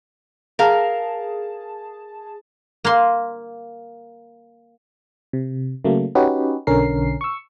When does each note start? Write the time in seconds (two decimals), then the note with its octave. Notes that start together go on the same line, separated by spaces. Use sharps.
0.59 G#4 A#4 F5 A5
2.84 A#3 C6
5.33 C3
5.85 C#3 F#3 A3 A#3
6.15 C#4 D#4 F#4 G4 B4
6.67 B1 D3 C#4 A#4 C7
7.21 C#6 E6